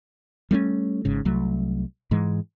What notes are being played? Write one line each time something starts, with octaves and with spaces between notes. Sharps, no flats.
G3 A3 C4 C#4
G#1 G#2 C#3
C2 F#3 A3
G#2 E3 G#3